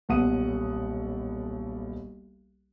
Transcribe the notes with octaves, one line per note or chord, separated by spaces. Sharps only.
D#1 B1 F#5 D#6 D#7